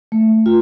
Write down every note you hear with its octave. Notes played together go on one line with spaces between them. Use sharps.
A3
F4